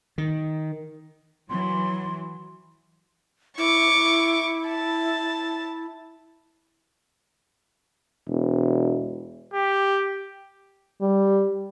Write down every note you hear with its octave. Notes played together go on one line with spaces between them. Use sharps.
D#3
E3 F#3 C6
E4 C#6 D6
A5
E1
G4
G3